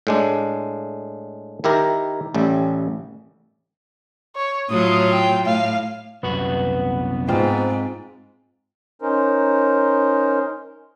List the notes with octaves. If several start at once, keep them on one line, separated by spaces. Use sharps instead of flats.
A2 G#3 D4
D#3 E4 G4 A#4
A1 A2 G3
C#5
A2 F#3 F4 D#6
G5
A2 F5
C2 F#2 B3 F#4
G#2 C4 F4
C#4 D#4 A#4 C5